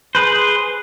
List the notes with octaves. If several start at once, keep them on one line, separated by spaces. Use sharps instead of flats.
G#4 B4 C5